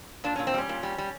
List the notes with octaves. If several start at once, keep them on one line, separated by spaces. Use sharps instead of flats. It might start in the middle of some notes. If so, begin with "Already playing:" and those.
A#2 D4
A#2 C#4
C4
G3 C#4
A#2
G3
G3